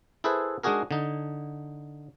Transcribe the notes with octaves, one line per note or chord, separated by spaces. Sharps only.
E4 G#4 A4 B4 C5 E5
G#3 D4 D#4 F#4 G#4 A#4
D3 D#4